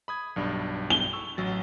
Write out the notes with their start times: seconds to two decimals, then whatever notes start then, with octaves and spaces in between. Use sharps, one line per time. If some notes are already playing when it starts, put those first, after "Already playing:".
0.08 B5 D#6 G#6
0.36 B1 G2 D4
0.90 G7
1.13 C#6 E6
1.37 A1 F#3 A6